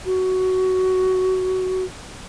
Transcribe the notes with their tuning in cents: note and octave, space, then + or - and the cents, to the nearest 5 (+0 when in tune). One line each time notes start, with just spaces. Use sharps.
F#4 +10